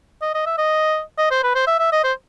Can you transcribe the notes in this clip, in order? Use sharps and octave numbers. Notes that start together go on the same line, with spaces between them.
D#5
D#5
E5
D#5
D#5
C5
B4
C5
E5
E5
D#5
C5